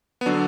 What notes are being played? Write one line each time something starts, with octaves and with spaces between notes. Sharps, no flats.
B3
D3 F#3 D4